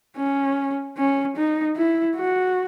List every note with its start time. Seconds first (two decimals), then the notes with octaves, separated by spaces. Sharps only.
0.17 C#4
0.97 C#4
1.36 D#4
1.76 E4
2.16 F#4